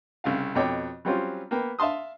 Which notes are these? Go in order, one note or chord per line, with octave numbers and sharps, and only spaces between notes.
C2 C#3 F5
F2 B2 A4 C#5 G5 D6
F#3 G3 C4 C#4 F4
A#3 B3 G5
E5 F5 A5 C6 D#6